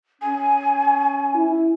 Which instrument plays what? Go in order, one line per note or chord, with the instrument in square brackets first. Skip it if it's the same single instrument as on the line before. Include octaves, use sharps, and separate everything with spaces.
[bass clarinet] C#4 [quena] G#5
[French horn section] E4